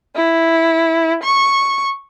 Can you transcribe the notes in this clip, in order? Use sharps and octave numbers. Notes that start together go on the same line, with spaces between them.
E4
C#6